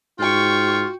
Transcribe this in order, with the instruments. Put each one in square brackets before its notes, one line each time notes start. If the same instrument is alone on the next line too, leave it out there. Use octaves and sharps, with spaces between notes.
[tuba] G#2 [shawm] F4 [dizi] F#4 [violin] G5 C#6